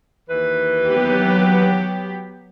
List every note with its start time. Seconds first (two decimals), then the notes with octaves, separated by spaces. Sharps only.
0.29 D#2 E3 B4
0.89 F#3 B3 G4